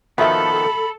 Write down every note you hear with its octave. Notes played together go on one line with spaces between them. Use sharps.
D#3 F3 B3 F#4 A4 E5 B5